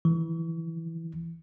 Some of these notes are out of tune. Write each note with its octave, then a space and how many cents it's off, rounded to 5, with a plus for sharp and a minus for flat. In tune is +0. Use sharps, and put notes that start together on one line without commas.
E3 +0